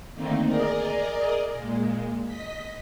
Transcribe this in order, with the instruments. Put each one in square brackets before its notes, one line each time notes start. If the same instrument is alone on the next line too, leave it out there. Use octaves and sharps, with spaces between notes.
[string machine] D3 D#3 A3 A#3 C4 D#4
G#4 A#4 D5 D#5
A#2 G#3
D#5 B6